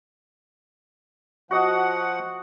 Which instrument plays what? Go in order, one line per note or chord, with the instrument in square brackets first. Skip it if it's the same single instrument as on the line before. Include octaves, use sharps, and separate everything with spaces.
[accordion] F3 F#5 [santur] F#4 D#5